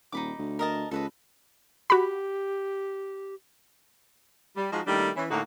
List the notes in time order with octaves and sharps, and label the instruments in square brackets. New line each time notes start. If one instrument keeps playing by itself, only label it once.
[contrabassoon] D#1 [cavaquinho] D#4 B5 D6
[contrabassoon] D2
[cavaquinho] A#4 D#5 A5
[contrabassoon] C#2 [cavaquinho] A4 B4 D#5
[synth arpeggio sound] F#4 B5 [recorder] G4
[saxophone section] G3
F3 G#3 D#4 F#4
D#3 G3 A3 A#3 D4 E4
E3 C#4
A2 D3 A#3 D#4 F#4